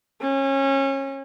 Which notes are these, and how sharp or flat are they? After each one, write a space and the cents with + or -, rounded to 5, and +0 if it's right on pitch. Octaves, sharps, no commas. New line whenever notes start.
C#4 -25